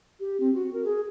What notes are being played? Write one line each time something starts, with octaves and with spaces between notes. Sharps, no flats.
G4
C4
F#4
A#4
G#4